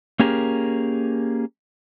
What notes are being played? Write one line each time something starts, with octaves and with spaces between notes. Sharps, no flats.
A#3 C#4 G4 G#4 A#4